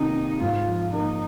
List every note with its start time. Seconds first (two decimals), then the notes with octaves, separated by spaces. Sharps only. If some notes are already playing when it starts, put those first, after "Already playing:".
Already playing: C3 D#3 A#3 D#4
0.15 C3
0.41 G#2 F4
0.67 F3
0.93 A#3 D#4